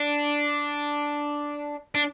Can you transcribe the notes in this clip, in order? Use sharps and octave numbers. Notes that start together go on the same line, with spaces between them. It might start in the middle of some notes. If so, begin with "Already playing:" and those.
Already playing: D4
D4